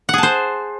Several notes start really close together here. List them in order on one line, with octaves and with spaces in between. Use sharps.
F#5 G#4 A5 C5